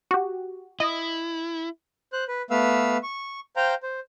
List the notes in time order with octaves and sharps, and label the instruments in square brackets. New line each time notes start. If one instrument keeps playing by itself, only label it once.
[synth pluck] F#4 G4
[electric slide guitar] E4 [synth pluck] D#5
[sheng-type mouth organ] C5 F#6
B4
A3 B3 B4 F5 E6
C#6
C5 F5 G5 A#5
C5